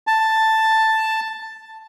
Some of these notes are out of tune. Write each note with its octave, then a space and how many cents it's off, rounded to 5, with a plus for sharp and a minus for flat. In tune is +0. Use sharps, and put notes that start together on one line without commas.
A5 +5